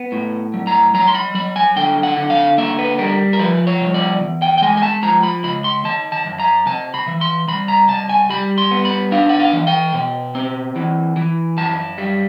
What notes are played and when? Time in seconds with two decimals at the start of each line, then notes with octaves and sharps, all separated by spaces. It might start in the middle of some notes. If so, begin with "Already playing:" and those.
Already playing: B3
0.12 A2
0.54 F#3
0.67 A#5
0.94 F#3 A#5
1.08 C6
1.15 B5
1.35 F#3 B5
1.56 G#5
1.76 D3 G5
2.03 F#5
2.17 D3
2.30 F5
2.58 A#3 E5
2.79 B4
2.99 G3 A#4
3.33 A#4
3.39 F3 B4
3.67 C#5
3.81 C2
3.94 D5
4.21 E2
4.42 G5
4.58 G5
4.62 G#3 G#5
4.77 G#5
4.83 A5
5.03 F3 A#5
5.23 B5
5.44 C#2 B5
5.64 C6
5.85 D#3 A5
6.12 A5
6.26 F#2
6.40 A#5
6.66 C3 A5
6.94 B5
7.07 E3
7.21 C6
7.48 C2 B5
7.68 A#5
7.89 C2 A5
8.09 G#5
8.30 G3 B5
8.58 C6
8.71 B3
8.85 B5
9.12 D4 F5
9.29 F#5
9.40 F5
9.53 E3
9.67 G5
9.94 B2
10.35 C4
10.76 E3
11.17 E3
11.57 F#2 A5
11.98 G3